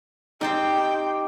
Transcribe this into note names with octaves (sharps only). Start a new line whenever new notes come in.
C4 D#4 G4 D5 G5